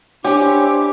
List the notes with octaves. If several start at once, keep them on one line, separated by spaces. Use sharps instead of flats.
D4 E4 G4 C5 C#5 G#5 D6